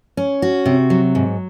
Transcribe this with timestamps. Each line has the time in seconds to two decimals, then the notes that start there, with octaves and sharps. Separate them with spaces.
0.17 C#4
0.42 F#4
0.66 C3
0.90 F#3
1.15 G#2